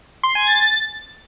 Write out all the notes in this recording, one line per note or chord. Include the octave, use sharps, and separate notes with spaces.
C6
G#5
A6